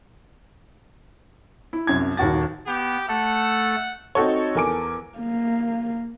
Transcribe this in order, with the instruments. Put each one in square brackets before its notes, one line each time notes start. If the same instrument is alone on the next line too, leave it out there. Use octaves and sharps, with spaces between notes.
[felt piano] E4
C2 F#2 G#6
D#1 D#2 F#4 A6
[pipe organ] B3 [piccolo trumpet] G4
[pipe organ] A3 A4 [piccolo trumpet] F#5
[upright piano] C4 D#4 F#4 A4 C#5
E2 A4 A#4 G#5 D6 D7
[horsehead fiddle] A#3